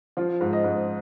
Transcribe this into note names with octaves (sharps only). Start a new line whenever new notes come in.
F3 F4
G#2
D#5
G#2